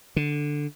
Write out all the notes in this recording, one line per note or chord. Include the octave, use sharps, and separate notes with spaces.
D3